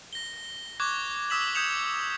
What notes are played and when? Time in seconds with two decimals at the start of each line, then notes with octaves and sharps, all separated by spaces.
0.13 A#6 G7
0.80 C#6 D6 F#6 G#6
1.30 C#6 D#6 E6 B6 E7 F#7
1.55 D#6 G6 G#6 C#7 E7 F7